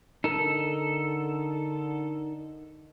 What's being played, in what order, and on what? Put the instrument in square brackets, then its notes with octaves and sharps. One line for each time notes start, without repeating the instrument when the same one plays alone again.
[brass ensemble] D3 [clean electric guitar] D#4 A#4 [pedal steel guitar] A4